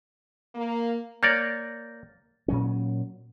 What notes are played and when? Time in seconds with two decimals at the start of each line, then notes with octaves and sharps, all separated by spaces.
0.55 A#3
1.23 A#3 C#5 D5 G6 A6 A#6
2.48 A#2 F#3 C#4